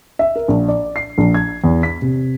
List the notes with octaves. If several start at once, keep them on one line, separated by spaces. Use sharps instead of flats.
E5
A#4
A#1
D5
C7
A#1
G#6
E2
B6
C3